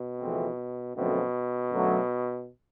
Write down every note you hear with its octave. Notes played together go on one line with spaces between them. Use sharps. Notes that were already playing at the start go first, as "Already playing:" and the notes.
Already playing: B2
F2 C#3 E3 A3 C4
F#2 B2 D3 F3 A3 C4
F#2 D3 F#3 A3